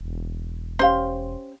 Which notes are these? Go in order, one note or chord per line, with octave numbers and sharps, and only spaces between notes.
E1
C#4 G4 C5 F5 C6